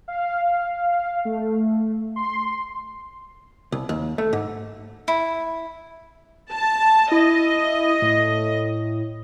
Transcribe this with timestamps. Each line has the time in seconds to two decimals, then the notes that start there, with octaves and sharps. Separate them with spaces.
0.08 F5
1.25 A3
2.16 C6
3.72 C2
3.89 D#2
4.18 A3
4.33 G#2
5.08 E4
6.51 A5
7.12 E4 D#5
8.02 A2